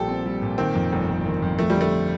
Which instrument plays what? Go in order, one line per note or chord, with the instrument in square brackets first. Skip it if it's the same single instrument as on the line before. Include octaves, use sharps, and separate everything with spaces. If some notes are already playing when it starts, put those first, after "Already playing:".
Already playing: [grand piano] A#1 A#2 G3 [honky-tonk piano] G4 A4
[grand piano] C4
G3
A#2
[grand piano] D#3 [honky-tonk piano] C4
[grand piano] F2
G1
G1
D#3
F2
[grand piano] F3 [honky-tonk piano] A3
[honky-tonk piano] G3
[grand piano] D3
[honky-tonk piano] A3